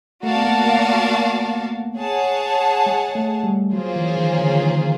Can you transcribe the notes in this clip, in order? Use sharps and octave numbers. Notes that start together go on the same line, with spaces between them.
A3 F#4 A#4 D5 F5 A5
B3
A#3
A#3
G#4 C#5 F#5 A5
G#3
A3
G3
F#3 A#3 C#4 F4 G#4 C5
E3
D#3
D3
D#3